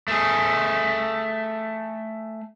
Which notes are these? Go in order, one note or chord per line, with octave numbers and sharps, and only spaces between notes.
A3 G#4